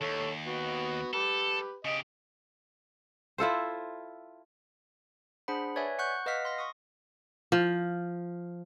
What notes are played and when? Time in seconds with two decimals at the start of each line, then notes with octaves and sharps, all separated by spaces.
0.01 D#2 A4 C#5
0.46 B3 F#4
1.13 G4 A4 B4
1.85 C#3 G4 D#5
3.38 E4 F4 A4 C5
5.48 D4 G#4 C5 F#5 B5
5.76 B4 C#5 D5 E5 G#5
5.99 F#5 C#6 F#6 G6
6.26 B4 D#5 F5 F#5 F6 B6
6.45 C6 A#6
6.58 C#6 D#6
7.52 F3